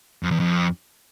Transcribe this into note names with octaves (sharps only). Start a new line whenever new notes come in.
F2
E2
F2